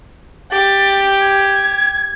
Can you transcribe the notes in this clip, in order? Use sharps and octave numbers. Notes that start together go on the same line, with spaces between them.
G4 A6
G#6